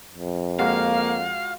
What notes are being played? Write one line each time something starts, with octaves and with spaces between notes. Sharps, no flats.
F2
G#3 A#3 F4 F#4 F5